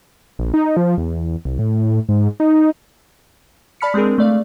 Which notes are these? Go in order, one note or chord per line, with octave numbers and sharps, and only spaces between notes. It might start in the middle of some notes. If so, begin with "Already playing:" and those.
A#1
D#4
F3
E2
C2
A2
G#2
D#4
D5 A5 B5 F6 B6 C#7
G#3 C4 D4 G#4 A#4
A3 D5 F5